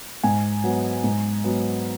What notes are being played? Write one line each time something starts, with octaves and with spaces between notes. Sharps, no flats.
G#2 G#5
F#3 B3
G#2
F#3 B3